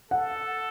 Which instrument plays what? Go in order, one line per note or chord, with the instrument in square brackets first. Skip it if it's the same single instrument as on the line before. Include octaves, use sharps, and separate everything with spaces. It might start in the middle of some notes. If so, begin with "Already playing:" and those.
[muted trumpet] A4 [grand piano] F#5